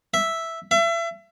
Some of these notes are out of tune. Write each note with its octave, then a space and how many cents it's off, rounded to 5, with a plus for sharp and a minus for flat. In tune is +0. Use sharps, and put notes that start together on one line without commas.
E5 +0
E5 +35